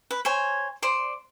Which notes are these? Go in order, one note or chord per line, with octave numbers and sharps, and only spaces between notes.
B4
C5 C#5 G#5
C5 D5 C6